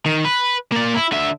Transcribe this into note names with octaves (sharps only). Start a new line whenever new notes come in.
D#3
B4
A#3 D5
E4
D3 E5